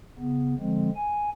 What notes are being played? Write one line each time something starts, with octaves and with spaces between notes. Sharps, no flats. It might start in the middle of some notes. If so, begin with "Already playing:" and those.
C#3 B3
D3 F3 G#3 C4
G#5